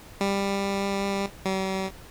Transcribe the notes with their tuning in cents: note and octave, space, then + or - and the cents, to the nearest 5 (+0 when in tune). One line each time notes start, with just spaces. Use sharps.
G3 +15
G3 -45